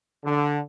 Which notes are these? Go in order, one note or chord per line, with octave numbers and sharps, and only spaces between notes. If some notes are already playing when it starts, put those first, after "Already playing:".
D3